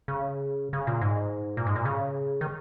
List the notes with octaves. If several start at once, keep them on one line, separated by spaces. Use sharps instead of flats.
C#3
C#3
A#2
G#2
A#2
G#2
A#2
C#3
D#3